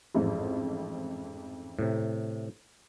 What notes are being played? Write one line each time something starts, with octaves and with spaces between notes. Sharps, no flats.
A1 F2 G#2
A2 C3